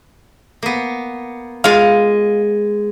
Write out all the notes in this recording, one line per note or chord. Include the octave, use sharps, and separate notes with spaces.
A#3 B3
G#3 F4 F5